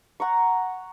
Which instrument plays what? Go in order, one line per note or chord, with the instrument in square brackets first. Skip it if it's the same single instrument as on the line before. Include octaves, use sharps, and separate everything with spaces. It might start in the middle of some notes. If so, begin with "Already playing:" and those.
[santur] F#5 A#5 C#6